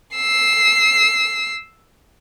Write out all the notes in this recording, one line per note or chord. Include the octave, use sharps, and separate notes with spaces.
E6 C7